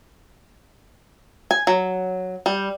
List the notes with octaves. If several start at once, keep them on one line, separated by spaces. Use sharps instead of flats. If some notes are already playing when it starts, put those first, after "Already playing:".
G#5
F#3
G3